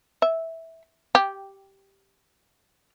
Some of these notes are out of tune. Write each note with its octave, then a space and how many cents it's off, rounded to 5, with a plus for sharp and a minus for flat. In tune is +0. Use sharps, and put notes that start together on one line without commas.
E5 -10
G4 -5